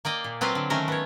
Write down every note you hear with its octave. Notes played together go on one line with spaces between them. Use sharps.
A#3 D5 D#5 G5
A#2
F#3 C4 F4 B4 F5
D3
D#3 A3 C#4 A#4 C5
B3 C#5